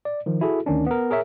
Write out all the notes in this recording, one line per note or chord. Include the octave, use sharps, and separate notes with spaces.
D5
D#3 F3
E4 F#4 G#4 A4
D2 D#3 C#4 D4
B3 A#4
G#4 A#4 C#5 E5